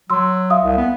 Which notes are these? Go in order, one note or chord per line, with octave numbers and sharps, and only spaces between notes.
F#3 C6 E6
E5 F5 D#6
C2
B3